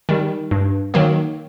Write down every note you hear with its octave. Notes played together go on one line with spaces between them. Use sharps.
D#3 G3
G2
D#3 F#3 A#3